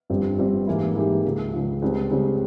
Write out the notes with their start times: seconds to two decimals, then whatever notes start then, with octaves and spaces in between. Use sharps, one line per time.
0.10 G1 G2 F3 C4 G4
0.38 G1 G2 F3 C4 G4
0.67 G#2 E3 A#3 E4 G4
0.96 G#2 E3 A#3 E4 G4
1.25 C#2 C#3 F3
1.53 C#2 C#3 F3
1.82 C#2 C#3 G3 C4
2.10 C#2 C#3 G3 C4